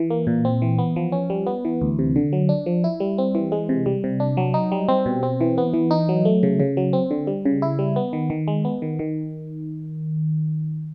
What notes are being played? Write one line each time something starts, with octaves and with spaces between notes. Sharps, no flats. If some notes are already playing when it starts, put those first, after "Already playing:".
Already playing: E3
A#3
A#2
C4
E3
B3
F3
C#4
G3
B3
E3
D2
C3
D3
F#3
D4
F3
E4
G3
C4
E3
G#3
C3
G3
C3
D4
F#3
D#4
G3
C4
B2
C4
E3
B3
E3
D#4
F#3
A3
C#3
C#3
F#3
C4
D3
G3
C#3
E4
G3
B3
D#3
D#3
G#3
B3
D#3
D#3